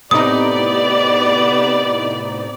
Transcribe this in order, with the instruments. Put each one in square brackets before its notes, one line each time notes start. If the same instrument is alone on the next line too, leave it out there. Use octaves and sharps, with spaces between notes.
[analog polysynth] A2 C3 D#4 [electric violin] B3 G4 [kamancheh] D5 [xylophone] D#6